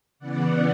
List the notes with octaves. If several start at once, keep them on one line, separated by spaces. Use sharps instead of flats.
C#3 E3 B3 D5 F#5